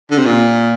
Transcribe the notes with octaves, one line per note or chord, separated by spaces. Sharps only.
D3
C3
A#2